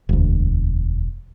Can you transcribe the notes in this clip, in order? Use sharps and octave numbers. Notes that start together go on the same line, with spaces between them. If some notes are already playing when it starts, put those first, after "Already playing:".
E1 D2